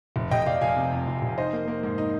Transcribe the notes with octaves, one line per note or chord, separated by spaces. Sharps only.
F1
F1 D#5 G5
G5
F1 D5 F5
F1 F5 G#5
C3
F2
F1
F1
D#4 C5 D#5
A#3
A#3
G#2
D#4